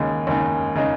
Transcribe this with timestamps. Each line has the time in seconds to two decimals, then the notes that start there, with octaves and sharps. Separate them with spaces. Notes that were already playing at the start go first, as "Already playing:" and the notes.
Already playing: D#2 C#3 G#3 D#4
0.27 D#2 C#3 G#3 D#4
0.75 C#3 G#3 D#4